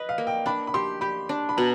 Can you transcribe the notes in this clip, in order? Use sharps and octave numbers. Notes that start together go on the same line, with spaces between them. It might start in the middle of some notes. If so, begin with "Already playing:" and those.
Already playing: B4 D#5
F5
A#3
G5
D4 B5
B5
G4 C6
G4 B5
D4
B5
B2 A#5